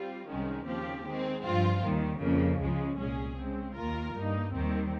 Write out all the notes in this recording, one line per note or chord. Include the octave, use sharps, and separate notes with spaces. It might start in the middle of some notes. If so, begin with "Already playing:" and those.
Already playing: G3 C4 F4
C2 C3 D#3 G#3 C#4
D#2 C#3 F3 C4 G4
D#3 G#3 C4
G2 F3 C4 F4
D#2 D#3 G3
F2 C#3 F3 A#3
C#2 C#3 F3 G#3
C2 A#2 G#3 C#4 G#4
C#3 G#3 C4
D#2 D#3 A#3 F4 A#4
G2 G3 A#3 D#4
D#2 D#3 G3 C4